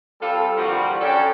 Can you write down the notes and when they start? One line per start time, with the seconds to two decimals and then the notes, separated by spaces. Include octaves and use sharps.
0.21 G3 C4 F4 A4
0.57 A#2 D3 E3 F3 G3 F#4
1.01 F#2 C#4 D4 A4 D5 G5